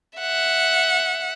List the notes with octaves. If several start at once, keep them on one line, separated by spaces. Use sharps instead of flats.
E5 F#5